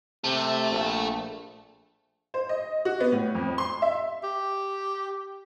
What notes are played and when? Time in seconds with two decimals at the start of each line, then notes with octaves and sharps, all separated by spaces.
0.24 C3 A3
0.70 A#1
2.34 C5
2.49 D#5
2.85 F#4
3.00 B3
3.12 A2
3.35 F2
3.58 C6
3.82 E5
4.24 G4